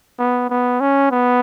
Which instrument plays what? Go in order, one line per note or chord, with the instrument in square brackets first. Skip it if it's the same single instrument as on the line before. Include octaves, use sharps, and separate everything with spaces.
[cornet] B3
B3
C#4
B3